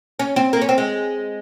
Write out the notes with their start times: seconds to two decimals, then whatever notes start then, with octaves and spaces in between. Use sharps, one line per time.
0.19 C#4
0.36 C4
0.53 A#3
0.62 C#4
0.69 C4
0.78 G#3